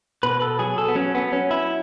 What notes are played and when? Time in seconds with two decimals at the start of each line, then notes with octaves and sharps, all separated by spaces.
0.23 B2 B4
0.42 A4
0.59 F#3 G#4
0.78 A4
0.88 B3
0.95 F#3 C#4
1.15 B3
1.32 F#3 C#4
1.51 E4